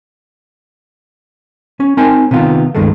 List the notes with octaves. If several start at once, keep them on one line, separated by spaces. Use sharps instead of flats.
C#4
C4 D#4 A#4 C5 G#5
C3 D#3 B3 F4
C#2 G2 D#3 G#3 A3